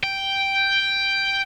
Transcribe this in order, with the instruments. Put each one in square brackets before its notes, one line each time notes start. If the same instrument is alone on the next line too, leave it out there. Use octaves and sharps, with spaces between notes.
[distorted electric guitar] G5